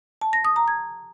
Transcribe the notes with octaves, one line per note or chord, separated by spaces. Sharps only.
A5
A#6
D#6
A#5
G#6